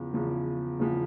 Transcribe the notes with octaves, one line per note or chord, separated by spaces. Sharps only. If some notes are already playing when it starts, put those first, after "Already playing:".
Already playing: E2 C#3 F3
E2 C#3 F3
E2 C#3 F3